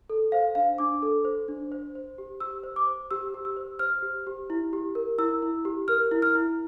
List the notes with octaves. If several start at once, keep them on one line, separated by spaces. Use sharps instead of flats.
A4
C5 F5
D4 F5
D4 D6
A4
C5
D4
C5
C5
G4
G4 E6
C5
D6
C5
G4 E6
G4
E6
C5
C5 F6
G4
G4
E4
G4
A#4
E4 E6
E4
G4
A#4 F6
E4
F6
E4